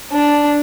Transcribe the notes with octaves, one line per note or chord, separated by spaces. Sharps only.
D4